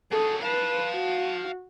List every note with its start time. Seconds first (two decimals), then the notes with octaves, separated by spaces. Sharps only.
0.12 F#3 G#4 A4
0.43 B4 F5 A5
0.94 F#4